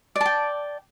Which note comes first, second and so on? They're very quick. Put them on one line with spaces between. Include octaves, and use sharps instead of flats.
D5 A5 G5